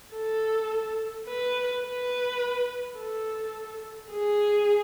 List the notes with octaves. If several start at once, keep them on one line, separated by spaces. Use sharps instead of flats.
A4
B4
B4
A4
G#4